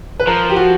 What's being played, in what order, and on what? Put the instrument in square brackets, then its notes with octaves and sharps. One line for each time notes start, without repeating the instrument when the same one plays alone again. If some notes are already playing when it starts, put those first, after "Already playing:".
[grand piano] B4
[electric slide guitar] F3 [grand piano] A#4
[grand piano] G4
F#4